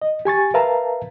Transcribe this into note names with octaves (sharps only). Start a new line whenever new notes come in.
D#5
G4 G#5 C#6 A6
A#4 B4 E5 F5 A5 A#5